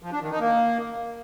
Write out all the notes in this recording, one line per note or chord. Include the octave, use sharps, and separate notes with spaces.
F3
D4
D#3
D#4
A#3